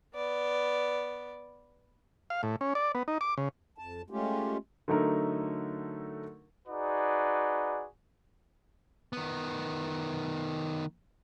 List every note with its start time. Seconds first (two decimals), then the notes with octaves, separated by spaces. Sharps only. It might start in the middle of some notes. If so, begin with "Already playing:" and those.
0.15 B3 D5
2.30 F5
2.43 A2
2.61 C#4
2.75 D5
2.95 B3
3.08 D#4
3.21 D6
3.38 C#3
3.78 F2 A5
4.10 G#3 A3 C#4 F4 G4
4.88 D3 F#3 A3 D#4 A#4
6.68 D#4 F#4 G#4 B4 D5
9.13 D#3 B3